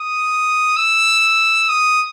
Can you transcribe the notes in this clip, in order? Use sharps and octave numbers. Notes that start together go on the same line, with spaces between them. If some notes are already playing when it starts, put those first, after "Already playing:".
Already playing: D#6
E6
D#6